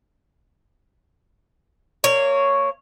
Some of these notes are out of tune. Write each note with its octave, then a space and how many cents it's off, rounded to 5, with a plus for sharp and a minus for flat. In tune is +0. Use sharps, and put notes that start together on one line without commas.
A#3 -25 C#5 +0